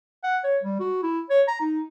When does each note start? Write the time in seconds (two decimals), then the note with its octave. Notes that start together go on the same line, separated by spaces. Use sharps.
0.23 F#5
0.44 C#5
0.63 G3
0.80 F#4
1.03 E4
1.30 C#5
1.48 A#5
1.61 D#4